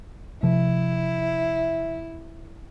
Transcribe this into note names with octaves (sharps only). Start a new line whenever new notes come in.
C3 F3 E4